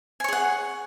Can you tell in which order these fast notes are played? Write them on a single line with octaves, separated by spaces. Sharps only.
G#5 C#5 G#4 F#5